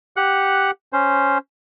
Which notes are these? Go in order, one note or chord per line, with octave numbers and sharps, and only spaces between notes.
G4 F#5 F#6
C#4 C5